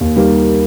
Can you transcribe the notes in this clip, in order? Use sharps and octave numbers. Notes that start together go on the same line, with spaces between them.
D#2
D#3 G3 A#3